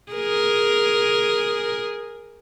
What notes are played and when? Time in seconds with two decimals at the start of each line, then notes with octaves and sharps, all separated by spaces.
0.12 G#4 A#4